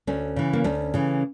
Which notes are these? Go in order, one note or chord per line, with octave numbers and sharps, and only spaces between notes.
D2 A3 C#4
C#3 E3
A#3
D2 A3 C#4
C#3 E3